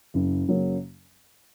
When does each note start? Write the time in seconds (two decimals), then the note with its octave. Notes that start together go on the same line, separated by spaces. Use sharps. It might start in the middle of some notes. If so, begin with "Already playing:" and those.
0.14 F#1
0.48 F#2 C#3 F#3 A#3